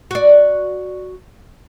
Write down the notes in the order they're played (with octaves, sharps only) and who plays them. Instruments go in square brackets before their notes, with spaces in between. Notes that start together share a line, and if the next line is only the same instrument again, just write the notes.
[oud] F#4 D5